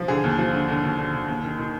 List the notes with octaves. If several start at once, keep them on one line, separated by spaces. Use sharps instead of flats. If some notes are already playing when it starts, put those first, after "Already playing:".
Already playing: F3
D3 G#4
D#2
F3
D3
D3
D#2
D3
D3
D#2
D#3
D#3